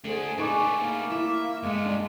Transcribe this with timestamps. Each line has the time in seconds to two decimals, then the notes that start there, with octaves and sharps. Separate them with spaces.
0.05 A3 D4 F#4 G#4 C5
0.38 G3 A3 D#4 B4 G#5 C#6 D6
0.76 A#3
1.12 E4 E5 D6
1.63 G2 G#3 A3
1.86 D4